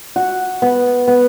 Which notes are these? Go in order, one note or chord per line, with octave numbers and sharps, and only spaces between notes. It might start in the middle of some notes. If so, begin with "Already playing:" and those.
F#4
B3
B3